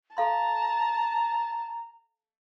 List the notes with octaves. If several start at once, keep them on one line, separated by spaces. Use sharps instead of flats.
A4 F5 A5 A#5 C6